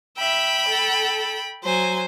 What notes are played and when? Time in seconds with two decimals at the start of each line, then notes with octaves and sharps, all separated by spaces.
0.18 E5 G5 B5
0.68 A4
1.64 F#3 C5 G#5